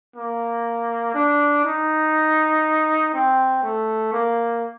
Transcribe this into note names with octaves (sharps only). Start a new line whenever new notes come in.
A#3
D4
D#4
C4
A3
A#3